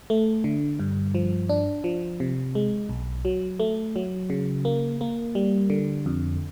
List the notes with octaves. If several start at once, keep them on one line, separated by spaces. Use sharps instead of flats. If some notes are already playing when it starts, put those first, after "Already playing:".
A3
D3
G2
F3
D4
F3
C3
G#3
B1
F#3
A3
F#3
C#3
A#3
A#3
G3
D3
F2